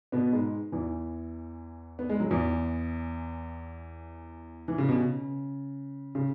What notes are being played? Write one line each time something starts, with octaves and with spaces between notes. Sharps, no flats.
B2 B3
G#2 G#3
E2 E3
B3
G#3
F#3
E2 E3
E3
C#3
B2
C#3
C#3